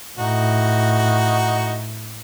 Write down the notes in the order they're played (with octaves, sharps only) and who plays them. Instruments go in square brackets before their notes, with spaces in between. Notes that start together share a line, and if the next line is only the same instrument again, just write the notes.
[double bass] A2 [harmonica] D#4 F#4